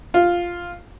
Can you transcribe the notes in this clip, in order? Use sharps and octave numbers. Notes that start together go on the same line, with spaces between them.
F4